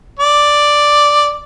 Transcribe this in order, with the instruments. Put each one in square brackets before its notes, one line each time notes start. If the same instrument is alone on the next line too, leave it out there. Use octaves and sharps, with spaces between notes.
[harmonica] D5